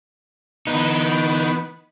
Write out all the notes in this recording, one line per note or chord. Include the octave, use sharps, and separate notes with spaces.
E3 B3 D#4